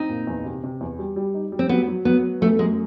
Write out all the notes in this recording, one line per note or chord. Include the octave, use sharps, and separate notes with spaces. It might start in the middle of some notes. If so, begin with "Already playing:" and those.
Already playing: C4 D#4
A#2
E2
C3
C3
E2
G3
G3
D#4
G3
C4
F#3 B3
F#3
F#3 B3
B3
F#2 A3
F#2 G#3